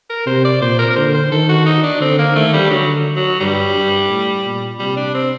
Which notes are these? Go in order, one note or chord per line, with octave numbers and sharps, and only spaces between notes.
A#4
C3 C5
D5
A#2 C5
A#4
A#4
D3 C5
C5
D#3 A4
F#4
D#4
D4
D3 C4
A#3
D#3 A3
G3
D3 F#3
F#3
G2 G3
G2
A2
A#2
C3 G3
D4
C4